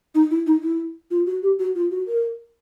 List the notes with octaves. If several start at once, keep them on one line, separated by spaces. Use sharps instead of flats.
D#4
E4
D#4
E4
F4
F#4
G4
F#4
F4
F#4
A#4